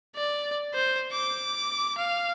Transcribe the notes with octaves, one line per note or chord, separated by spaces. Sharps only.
D5
C5
D6
F5